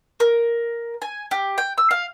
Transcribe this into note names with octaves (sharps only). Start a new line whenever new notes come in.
A#4
G#5
G4
G5
E6
F5